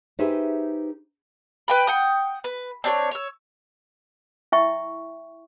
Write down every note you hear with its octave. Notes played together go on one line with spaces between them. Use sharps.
D#4 G4 G#4 B4 C5 E5
B4 G5 B5
F#5 G5 D#6
B4
C4 D4 A4 C#5
C#5 E6
E4 E5 G5 C#6